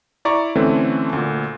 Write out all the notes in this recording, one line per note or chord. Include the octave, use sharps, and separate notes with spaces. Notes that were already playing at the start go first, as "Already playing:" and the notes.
E4 D5 A#5 C#6
D3 E3 A3 C4 C#4
D2 A#2